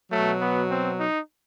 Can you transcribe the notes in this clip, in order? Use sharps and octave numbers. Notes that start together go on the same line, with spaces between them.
B2 F#3 A3
B3
C4
D#4